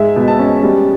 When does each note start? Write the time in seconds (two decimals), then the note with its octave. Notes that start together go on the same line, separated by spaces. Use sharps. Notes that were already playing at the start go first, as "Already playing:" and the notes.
Already playing: G#2 G#3 E5
0.16 B2
0.28 A5
0.39 C#4
0.63 G3